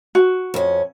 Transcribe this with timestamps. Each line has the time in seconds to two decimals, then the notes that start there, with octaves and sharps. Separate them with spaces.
0.15 F#4
0.54 F2 C#4